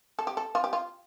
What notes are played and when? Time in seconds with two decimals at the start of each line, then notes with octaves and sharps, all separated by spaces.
0.19 A4
0.27 G4
0.37 A4
0.55 F4
0.64 G4
0.73 F4